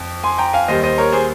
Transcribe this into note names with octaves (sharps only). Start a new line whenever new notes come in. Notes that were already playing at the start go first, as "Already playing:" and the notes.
Already playing: F2
G#5 C6
G5 A#5
F5 G#5
D#2 D#3 G3 C5 D#5
C5 D#5
A#4 C#5
G#4 C5